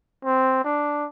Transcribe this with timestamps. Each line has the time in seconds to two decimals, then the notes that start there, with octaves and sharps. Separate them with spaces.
0.24 C4
0.64 D4